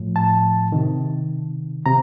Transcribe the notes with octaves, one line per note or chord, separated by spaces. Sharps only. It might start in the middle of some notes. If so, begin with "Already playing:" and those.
Already playing: A2 F3
A5
C3 D#3
C3 A#5